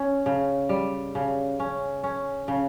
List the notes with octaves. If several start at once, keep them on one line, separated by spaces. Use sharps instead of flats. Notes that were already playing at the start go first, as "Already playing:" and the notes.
Already playing: C#4
C#3
G3
C#3
C#4
C#4
C#3